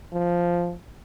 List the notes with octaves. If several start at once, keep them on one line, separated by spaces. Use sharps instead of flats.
F3